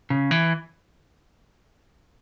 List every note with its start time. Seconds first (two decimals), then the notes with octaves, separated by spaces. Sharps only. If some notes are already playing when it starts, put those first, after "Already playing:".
0.10 C#3
0.31 E3